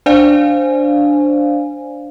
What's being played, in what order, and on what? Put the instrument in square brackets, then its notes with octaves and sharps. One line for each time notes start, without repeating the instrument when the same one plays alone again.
[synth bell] D4 C5 D5 F5 G#5